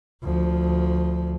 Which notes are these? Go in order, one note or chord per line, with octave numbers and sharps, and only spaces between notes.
D2 F3